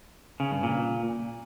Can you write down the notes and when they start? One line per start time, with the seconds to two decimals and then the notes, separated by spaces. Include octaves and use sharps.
0.40 C#3
0.52 G2
0.63 A#2